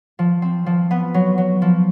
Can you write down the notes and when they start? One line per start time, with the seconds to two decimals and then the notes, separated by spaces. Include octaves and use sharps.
0.19 F3
0.42 C4
0.66 F3
0.91 B3
1.14 F#3
1.38 F#3
1.62 F3